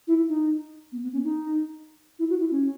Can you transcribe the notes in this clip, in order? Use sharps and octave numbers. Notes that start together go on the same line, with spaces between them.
E4
D#4
B3
B3
C#4
D#4
E4
F#4
E4
C#4